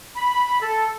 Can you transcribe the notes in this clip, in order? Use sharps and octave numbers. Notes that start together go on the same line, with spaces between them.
B5
A4